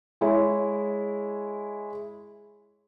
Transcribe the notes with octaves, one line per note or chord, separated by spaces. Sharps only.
G#3 E4 C#5